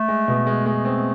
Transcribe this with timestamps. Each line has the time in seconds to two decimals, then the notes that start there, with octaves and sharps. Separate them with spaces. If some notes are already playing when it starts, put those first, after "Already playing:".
Already playing: A3
0.08 G#3
0.28 B2
0.47 G#3
0.66 G#3 A3
0.85 C4